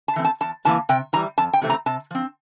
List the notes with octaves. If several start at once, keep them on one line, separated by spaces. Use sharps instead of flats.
A5
E3 A3 C4
A5
E2 A5
C3 E3 A#3 A5
C3 G5
E3 G3 A#5
F2 A5
G5
C3 E3 A3 C4
A#5
C3 A5
F3 C4